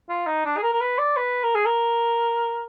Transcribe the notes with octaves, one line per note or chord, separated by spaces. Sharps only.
F4
D#4
D4
G#4
A#4
A#4
B4
D5
B4
A#4
G#4
A#4